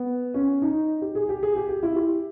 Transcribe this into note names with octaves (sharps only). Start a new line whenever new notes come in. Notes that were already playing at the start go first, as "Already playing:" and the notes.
Already playing: B3
C#4
D#4
G4
G#4
G4
G#4
G4
G4
E4
G4